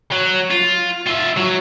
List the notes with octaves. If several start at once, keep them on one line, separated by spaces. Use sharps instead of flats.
F#3
F4
F4 E5
F#3